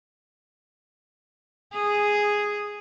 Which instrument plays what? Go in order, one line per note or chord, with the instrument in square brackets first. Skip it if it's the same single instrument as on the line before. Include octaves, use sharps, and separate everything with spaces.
[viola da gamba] G#4